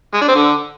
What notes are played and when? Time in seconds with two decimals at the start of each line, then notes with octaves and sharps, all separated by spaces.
0.14 G#3
0.21 D4
0.28 C4
0.35 D3